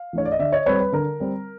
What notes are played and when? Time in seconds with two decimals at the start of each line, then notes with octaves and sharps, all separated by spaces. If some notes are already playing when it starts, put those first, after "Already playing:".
Already playing: F5
0.13 E3 A3 D4 C#5
0.25 D5
0.32 D#5
0.39 D3 D5 E5
0.53 C#5 D#5
0.66 G3 C4 B4 C#5
0.80 B4
0.93 D3 A#4
1.20 G3 C4